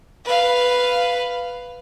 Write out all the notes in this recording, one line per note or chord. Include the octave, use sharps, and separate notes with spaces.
B4 F5